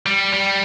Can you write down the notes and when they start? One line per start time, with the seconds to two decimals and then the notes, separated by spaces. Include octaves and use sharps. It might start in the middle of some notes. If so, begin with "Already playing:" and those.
0.06 G3
0.33 G3